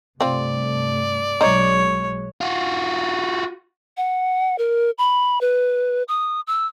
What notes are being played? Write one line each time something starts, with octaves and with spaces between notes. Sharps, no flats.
G2 C3 A3 C4 F4 D5
B1 F#3 G#3 D#4 C#5
F4 F#4
F#5
A#4
B5
B4
D#6
E6